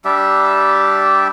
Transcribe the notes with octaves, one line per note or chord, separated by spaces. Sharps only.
G3 D4 G4 E5